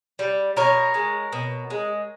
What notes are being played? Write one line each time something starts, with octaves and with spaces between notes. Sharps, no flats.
G3
B2 A#4 C#5
G#3
B2
G#3